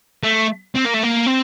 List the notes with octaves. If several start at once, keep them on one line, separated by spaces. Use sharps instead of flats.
A3
C4
A#3
A3
A#3
C4